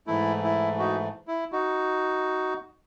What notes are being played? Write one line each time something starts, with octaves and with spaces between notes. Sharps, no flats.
G#2 E3 A3 E4
E4
D#4 F#4
E4
D#4 F#4